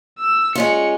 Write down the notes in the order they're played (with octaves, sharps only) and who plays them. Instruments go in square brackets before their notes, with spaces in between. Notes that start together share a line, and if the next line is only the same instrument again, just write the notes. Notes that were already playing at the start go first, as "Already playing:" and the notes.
[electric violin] E6
[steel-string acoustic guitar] G#3 C#4 F4 [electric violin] C#7